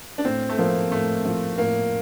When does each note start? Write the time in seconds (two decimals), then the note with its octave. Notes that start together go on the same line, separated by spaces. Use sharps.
0.18 D4
0.25 A2 C4
0.49 A3
0.58 F3 A#3 C4
0.91 A2 A3
1.25 F3 C4
1.58 A2 A#3